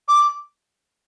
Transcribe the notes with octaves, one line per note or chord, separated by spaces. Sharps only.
D6